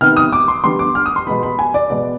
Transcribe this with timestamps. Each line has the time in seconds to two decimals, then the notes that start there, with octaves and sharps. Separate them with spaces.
0.01 C3 D#3 B3 F6
0.17 D#6
0.33 D6
0.48 C6
0.64 D3 G3 B3 C6
0.79 D6
0.95 F6
1.06 D#6
1.16 C6
1.27 B2 G#3 B3 B5
1.43 B5
1.59 G#5
1.74 D5
1.90 B2 G#3 B3 D5